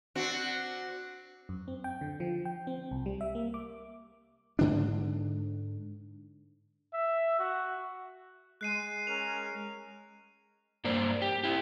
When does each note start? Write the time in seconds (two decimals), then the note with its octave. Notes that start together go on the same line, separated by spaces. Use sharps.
0.15 C4 D4 F#4
1.49 F#2
1.68 C4
1.84 G5
2.01 D3
2.20 F3
2.45 G5
2.67 C4
2.91 C2
3.06 G3
3.21 E5
3.35 A#3
3.54 D6
4.59 G#2 D3 D4
6.93 E5
7.39 F#4
8.61 G#3 F#6 C7 D#7
9.07 C#4 G#4 A#4 F7
10.84 G2 A#3 C5 D5
11.22 G4
11.44 E4 G4